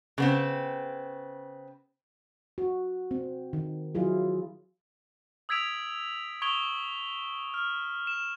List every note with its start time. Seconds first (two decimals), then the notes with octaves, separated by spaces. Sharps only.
0.18 C#3 B3 C4
2.58 F#4
3.11 C4
3.53 D#3
3.95 F#3 E4 F4 G#4
5.49 D#6 E6 G#6 B6 D7 F7
6.42 C#6 D#6 G#6 D7 F7 G7
7.54 F6
8.07 E7